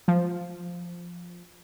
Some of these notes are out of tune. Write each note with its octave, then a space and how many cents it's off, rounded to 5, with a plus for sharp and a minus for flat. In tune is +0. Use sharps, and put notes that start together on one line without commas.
F3 +0